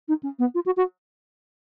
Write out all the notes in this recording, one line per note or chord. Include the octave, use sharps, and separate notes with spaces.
D#4
C#4
B3
F4
F#4
F#4